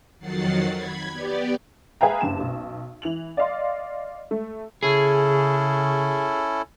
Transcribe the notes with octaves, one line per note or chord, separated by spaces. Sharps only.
F2 D#3 F#3 F#5 A6 C7
B5 G#6
B3 G4 D5
G#4 B4 E5 F5 G5 A#5
F#1 G2 E7
B1
E3 F7 F#7
D5 D#5 F5 C6
A3
C#3 C#4 E4 G#4 A4